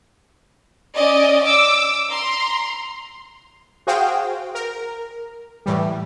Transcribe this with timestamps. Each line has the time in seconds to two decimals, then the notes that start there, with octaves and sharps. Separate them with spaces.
0.94 C#4 D5 D#5
1.44 D6 E6
2.11 A#5 C6
3.87 F#4 G#4 C5 F5 G5
4.55 A#4
5.66 A2 E3 G3